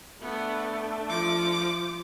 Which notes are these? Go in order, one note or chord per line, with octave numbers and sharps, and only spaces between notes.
A3 B3 D4
F3 D6